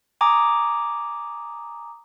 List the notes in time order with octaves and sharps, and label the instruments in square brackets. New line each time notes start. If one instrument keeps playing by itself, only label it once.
[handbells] G#5 A#5 D6 D#6